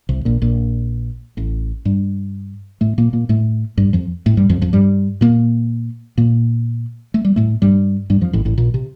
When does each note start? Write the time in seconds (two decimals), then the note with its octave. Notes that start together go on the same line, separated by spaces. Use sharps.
0.09 C2 C3
0.25 A#1 A#2
0.42 A#1 A#2
1.37 A1 A2
1.85 G2 G3
2.81 A2 A3
2.98 A#2 A#3
3.13 A#2 A#3
3.29 A2 A3
3.77 G2 G3
3.93 F2 F3
4.26 A2 A3
4.37 G2 G3
4.49 F2 F3
4.61 F2 F3
4.73 G2 G3
5.21 A#2 A#3
6.17 A#2 A#3
7.14 A3
7.25 G3
7.36 A2 A3
7.62 G2 G3
8.10 G2 G3
8.21 F2 F3
8.33 A1 A2
8.45 A1 A2
8.58 A#1 A#2
8.74 C3